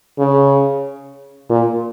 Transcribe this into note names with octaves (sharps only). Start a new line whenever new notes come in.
C#3
A#2